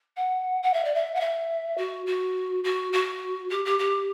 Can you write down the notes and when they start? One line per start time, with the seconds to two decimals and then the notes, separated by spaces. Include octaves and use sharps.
0.16 F#5
0.63 F#5
0.73 E5
0.84 D5
0.95 E5
1.15 F#5
1.20 E5
1.77 F#4
2.06 F#4
2.64 F#4
2.93 F#4
3.50 G4
3.65 G4
3.79 G4